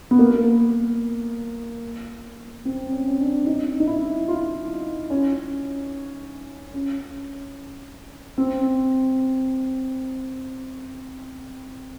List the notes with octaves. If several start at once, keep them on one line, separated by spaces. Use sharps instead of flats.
B3
A#3
C4
C#4
C#4
D4
D#4
D#4
E4
F4
C#4
C#4
C4